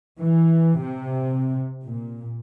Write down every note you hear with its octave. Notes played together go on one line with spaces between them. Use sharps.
E3
C3
A#2